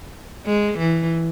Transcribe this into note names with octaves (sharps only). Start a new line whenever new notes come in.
G#3
E3